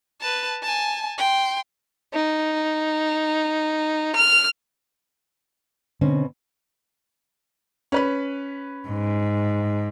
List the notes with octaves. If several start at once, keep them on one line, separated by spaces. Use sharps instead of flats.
B4 A5
G#5 A5
G5 C6
D#4
F6
B2 D3 C4 C#4
C#4 B4 B5
G#2